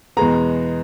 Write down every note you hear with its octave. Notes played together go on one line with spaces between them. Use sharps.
E2 B2 G#3 B3 A#5